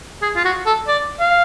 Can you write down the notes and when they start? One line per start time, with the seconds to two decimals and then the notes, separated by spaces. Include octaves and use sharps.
0.22 G#4
0.36 F4
0.45 F#4
0.66 A4
0.88 D5
1.20 F5